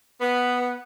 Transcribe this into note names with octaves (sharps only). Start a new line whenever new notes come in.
B3